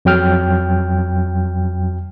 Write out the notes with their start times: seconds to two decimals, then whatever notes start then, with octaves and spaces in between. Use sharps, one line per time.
0.05 F2 F#3 G5 F6